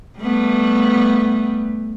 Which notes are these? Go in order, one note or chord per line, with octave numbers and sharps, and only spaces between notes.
G3 A3 B3